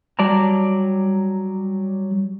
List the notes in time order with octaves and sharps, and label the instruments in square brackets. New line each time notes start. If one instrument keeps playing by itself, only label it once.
[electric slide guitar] F#3 G3 D5 A5 A#5